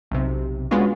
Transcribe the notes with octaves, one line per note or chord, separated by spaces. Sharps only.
B1 C3
G#3 B3 C#4 D4 F4 F#4